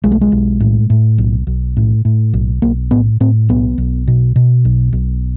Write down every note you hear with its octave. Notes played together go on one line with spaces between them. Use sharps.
B1 G#3
A3
G#3
B1
A2
A2
B1
B1
A2
A2
B1
B1 A#3
A2 B3
A2 C4
B1 B3
B1
B2
B2
B1
B1